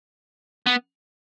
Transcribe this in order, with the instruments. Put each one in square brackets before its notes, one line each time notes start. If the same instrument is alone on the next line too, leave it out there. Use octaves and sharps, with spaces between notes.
[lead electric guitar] B3